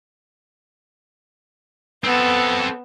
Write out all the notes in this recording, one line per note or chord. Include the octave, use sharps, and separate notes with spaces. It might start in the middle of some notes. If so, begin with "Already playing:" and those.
B3 C4 A4